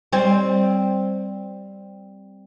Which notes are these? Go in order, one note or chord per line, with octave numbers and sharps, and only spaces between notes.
G3 C4